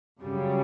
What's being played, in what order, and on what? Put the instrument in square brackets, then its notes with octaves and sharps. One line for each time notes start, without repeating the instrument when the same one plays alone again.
[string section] F#2 C#3 G3